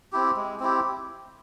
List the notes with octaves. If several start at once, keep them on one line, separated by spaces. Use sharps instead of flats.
C4 E4 G4
G#3
C4 E4 G4